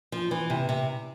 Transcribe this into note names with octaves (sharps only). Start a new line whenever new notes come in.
F3
E3
C3
C3